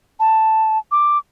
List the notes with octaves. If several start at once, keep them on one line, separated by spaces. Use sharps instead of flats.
A5
D6